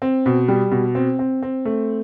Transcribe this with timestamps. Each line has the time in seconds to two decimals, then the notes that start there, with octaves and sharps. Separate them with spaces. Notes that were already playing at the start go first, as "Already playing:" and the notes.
0.02 C4
0.26 B2
0.48 G3
0.71 B2
0.95 C4
1.19 C4
1.43 C4
1.65 A3